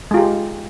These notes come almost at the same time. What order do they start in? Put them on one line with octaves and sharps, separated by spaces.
G#3 F4 G4